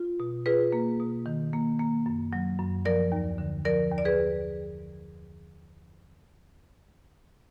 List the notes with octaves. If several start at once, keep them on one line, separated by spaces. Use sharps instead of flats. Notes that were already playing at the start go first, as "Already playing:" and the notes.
Already playing: F4
B2
F4 G#4 B4
A#3
B2
D#3
A#3
A#3
F#2
F#3
F#2
F3 A#4 D5
D#2
D3
F3 A#4 D5
D#2
D5
G#4 B4